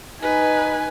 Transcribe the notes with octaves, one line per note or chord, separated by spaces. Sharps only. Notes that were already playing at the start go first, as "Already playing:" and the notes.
D#4 B4 G#5